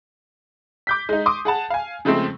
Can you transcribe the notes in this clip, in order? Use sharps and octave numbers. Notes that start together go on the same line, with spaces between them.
D6 G6 B6
G#3 D#4
C6 D6 D#6
G#4 F#5 A5
F5 G#5
C#3 F3 G#3 A3 C4